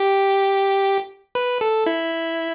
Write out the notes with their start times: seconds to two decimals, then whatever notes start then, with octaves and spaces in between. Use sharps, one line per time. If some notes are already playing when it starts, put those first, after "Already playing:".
Already playing: G4
1.35 B4
1.61 A4
1.86 E4